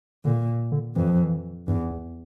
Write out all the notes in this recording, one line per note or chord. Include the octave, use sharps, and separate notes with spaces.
A#2 D3
D3
F2 E3
F3
E3
E2 G2
E2